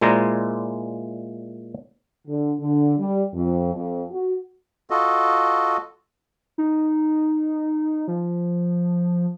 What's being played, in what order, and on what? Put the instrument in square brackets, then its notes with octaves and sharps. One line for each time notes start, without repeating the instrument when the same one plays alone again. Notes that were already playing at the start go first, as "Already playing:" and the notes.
[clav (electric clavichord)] A#2 G#3 E4 C5 D5 A#5
[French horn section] D3
D3
G3
F2
F2
F#4
[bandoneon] F4 F#4 A4 D#5
[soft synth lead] D#4
F3